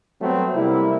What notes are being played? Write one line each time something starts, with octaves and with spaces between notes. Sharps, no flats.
F#3 G3 A3 B3 C4
C3 G3 A#3 E4